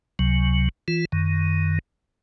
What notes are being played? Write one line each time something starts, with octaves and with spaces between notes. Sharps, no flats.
C#2 C3 F#3
E3 F4
F#2 D#3